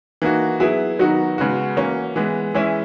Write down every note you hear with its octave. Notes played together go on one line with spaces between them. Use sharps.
E3 A#3 D#4 F#4
F#3 B3 E4 G#4
D#3 F#3 B3 D#4 F#4
C#3 G#3 B3 F#4
E3 A#3 C#4 F#4
E3 G#3 B3
E3 G#3 C#4 E4